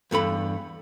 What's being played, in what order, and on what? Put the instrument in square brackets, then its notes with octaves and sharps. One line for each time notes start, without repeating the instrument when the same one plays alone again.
[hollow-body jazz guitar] E2 G2 A4 B5